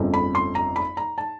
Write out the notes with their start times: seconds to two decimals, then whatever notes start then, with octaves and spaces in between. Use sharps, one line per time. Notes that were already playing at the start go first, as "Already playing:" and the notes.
Already playing: G1 F2 C#3 F3 A3
0.14 B5
0.35 C6
0.55 A#5
0.76 B5
0.97 A#5
1.18 A5